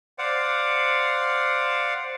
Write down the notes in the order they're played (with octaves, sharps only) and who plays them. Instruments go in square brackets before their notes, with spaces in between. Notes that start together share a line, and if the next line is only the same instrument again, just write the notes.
[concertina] C5 D5 F5 F#5